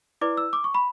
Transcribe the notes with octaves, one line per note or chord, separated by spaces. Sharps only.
E4 B4 D5 D6
E6
D6
C#6
B5